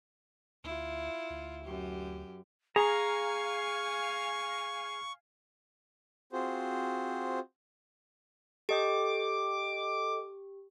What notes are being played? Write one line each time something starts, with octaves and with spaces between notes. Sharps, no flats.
D2 E4 F4
D2
F#2 G4
G#4 F5 G#5 A#5 C#6
C4 F4 F#4 G#4 C5
G4 A4 D#5 G5 D6